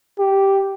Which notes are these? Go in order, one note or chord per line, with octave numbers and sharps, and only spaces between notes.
G4